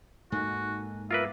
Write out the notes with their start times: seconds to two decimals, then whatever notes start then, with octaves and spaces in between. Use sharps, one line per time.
0.32 G#2 A#3 D#4 F#4 A4 G#5
1.11 B3 F4 A#4 B4 E5 D6 A6